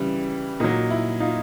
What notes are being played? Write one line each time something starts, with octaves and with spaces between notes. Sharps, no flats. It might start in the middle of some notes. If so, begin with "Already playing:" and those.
Already playing: C#3 E3 G3 E4
A#2 F#3 D#4
E4
D#4 F4